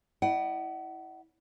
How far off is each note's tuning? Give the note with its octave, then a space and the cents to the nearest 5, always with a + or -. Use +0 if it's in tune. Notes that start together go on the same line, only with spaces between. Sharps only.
E4 -15 D5 +45 F#5 +30